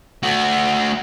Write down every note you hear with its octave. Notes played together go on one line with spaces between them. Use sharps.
A3 F#4